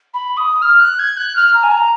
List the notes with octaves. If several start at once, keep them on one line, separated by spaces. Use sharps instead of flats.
B5
D#6
F6
F#6
G#6
F#6
F6
A#5
G#5
A#5